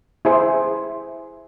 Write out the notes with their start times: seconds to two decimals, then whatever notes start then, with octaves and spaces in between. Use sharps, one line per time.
0.25 E4 G#4 C5 E5